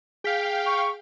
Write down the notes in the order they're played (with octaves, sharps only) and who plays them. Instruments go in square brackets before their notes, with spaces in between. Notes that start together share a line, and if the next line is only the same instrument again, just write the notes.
[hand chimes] G#4 B6 [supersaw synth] F5 G5
[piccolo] C#6